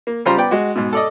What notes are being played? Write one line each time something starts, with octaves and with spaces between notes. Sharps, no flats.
A#3
C#3 G3 F4 C5 A#5 C6
B3 D5 G5
G#3 F#4
G#2 B2
A4 D5 D#5